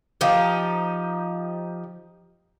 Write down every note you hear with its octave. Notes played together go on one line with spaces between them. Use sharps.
F3 D#4 G4